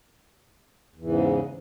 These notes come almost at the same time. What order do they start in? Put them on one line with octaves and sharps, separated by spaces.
E2 E3 G#2 C#3